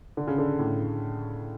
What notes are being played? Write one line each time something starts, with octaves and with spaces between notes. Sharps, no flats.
D3
C#3
D3
A2